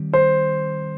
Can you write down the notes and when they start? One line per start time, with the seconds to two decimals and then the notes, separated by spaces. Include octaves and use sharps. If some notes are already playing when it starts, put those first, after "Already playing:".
Already playing: D#3 G3 C4
0.13 C5